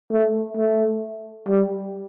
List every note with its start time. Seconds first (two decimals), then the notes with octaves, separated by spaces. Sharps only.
0.12 A3
0.57 A3
1.48 G3